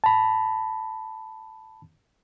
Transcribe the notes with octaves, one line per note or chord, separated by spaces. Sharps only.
A5 B5